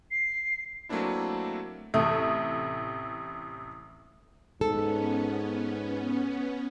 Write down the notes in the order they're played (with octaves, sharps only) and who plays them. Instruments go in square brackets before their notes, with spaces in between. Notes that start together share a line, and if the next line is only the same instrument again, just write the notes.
[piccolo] C7
[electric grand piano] F#3 A3 A#3 C4 D4 E4
[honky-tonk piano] A1 C3 D#6 [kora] A3
[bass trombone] G#2 [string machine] B3 C#4 [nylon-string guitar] A4